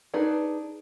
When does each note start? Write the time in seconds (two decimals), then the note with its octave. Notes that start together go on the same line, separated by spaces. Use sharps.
0.14 D4 D#4 G#4 B4